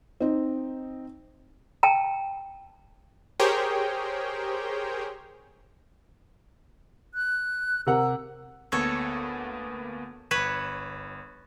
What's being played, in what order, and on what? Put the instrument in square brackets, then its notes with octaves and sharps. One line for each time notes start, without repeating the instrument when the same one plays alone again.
[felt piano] C4 D#4
[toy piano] G5 A5 A#5
[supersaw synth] G4 G#4 A#4 C5 C#5 G5
[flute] F#6
[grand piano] C3 A#4 F#5 [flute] E6
[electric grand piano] D2 A#3 B3 [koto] A4 C#5
[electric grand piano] G1 E7 [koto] B4 C#5